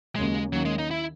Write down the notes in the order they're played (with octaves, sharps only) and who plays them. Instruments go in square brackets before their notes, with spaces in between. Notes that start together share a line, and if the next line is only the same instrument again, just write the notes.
[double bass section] D#2 C#3 F#3 A#3 C#4 [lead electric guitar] G#3
[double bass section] D#2 D#3 A#3 C#4 [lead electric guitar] F#3
[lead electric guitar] G#3
D#4
E4